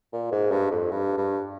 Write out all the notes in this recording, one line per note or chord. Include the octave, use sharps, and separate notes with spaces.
A#2
G#2
G2
F2
G2
G2